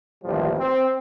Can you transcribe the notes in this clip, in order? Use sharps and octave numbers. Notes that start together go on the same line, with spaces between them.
A1 D#2 F3 G3
C4